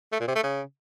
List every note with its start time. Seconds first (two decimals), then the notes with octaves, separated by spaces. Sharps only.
0.12 A3
0.20 A#2
0.28 C3
0.35 A3
0.43 C#3